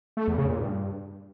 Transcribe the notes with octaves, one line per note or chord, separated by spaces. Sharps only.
A3
E2
C#3
A#2
G2